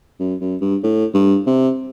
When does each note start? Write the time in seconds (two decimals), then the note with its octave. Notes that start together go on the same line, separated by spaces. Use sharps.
0.20 F#2
0.41 F#2
0.61 G2
0.83 A2
1.14 G2
1.46 C3